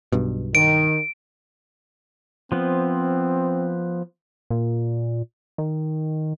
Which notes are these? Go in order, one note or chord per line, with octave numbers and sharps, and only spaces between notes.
B1 G2 B2
D#3 D7
F3 B3 C4
A#2
D#3